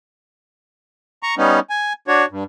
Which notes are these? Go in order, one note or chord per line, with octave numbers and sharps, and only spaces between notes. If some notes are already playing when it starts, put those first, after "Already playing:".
A#5 C#6
G3 B3 C#4 D#4
G#5
D4 F#4 C#5
G2